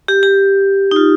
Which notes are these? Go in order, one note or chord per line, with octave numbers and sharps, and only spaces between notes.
G4
G4
D#4
F4